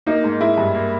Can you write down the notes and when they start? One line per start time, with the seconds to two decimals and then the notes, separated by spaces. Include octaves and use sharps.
0.07 A#3 D#4
0.24 G#2
0.40 G#3 E4
0.58 G2
0.75 A#3